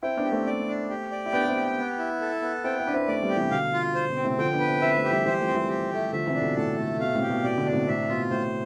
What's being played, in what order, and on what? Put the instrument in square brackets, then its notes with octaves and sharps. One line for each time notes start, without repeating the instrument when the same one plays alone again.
[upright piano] C4 E4 [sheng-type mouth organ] G5
[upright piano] B3 D4
[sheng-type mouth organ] G4
[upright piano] A3 C4
[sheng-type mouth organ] D5
D4
G4
D5
[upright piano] E4
[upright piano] B3 D4 [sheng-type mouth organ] G5
[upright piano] C4 E4
[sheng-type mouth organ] G4
B3
E4
A4
B3
[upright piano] C4 E4 [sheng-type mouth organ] G5
[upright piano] C4 E4
[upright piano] D4 [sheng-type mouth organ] B4
[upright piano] C4 E4
[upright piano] A3 C4 [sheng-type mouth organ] D5
[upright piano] G3 B3
[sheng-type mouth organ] G4
[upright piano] C3 E3
[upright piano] B2 D3 [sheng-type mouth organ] F5
[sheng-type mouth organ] F4
C5
[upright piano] B2
[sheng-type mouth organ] C4
[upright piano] A2 C3
[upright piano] D3 F3 [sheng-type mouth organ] G5
[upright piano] B3 D4
[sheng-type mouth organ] B4
[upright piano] C4 E4
[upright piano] C4 E4 [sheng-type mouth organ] E5
[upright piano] A3 C4
[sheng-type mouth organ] G4
[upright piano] E3 G3
[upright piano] E3 G3 [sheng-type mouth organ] C5
[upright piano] F3 A3
[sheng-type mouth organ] C4
[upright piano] E3 G3
[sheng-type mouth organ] G4
A3
[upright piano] D3 F3 [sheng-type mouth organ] E5
[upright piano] C3 E3
[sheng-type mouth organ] D4
[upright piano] B2 D3
[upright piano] A2 [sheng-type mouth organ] A4
[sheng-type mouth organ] A3
[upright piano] B2 [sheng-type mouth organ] F5
[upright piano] A2 C3
[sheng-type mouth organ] G4
[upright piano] B2
[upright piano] B2 [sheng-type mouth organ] D5
[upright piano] B2 D3
[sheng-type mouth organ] D4
[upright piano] A2 C3
[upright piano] A2 C3 [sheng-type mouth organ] E5
[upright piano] B2 [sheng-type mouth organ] F4
[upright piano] A2 [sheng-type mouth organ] C5